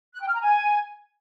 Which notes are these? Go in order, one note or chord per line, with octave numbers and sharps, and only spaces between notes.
F#6
G5
F6
A#5
G#5